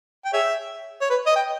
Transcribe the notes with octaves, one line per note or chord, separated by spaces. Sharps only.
G5
G#4 C#5 E5
C#5
B4
D#5
G5